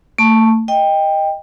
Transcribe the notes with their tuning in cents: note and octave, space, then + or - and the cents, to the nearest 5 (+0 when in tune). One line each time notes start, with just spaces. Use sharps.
A3 +35 A5 +0 C#6 -5
D#5 +0 G5 +15